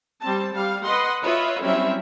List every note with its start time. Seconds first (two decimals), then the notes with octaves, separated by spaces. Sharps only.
0.22 G3 C4 A5
0.54 G3 F5
0.84 B4 D#5 F#5 C6
1.22 F4 B4 C#5 D#5 E5
1.61 F#3 G3 C4 C#4 E4 E5